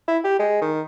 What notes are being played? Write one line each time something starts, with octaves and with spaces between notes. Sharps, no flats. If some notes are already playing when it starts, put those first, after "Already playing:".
E4
G4
G#3
D#3